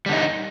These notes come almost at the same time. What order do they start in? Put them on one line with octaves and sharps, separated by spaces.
G3 D3 D#4